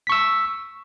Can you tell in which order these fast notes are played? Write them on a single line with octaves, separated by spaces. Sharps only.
B6 C#6 E6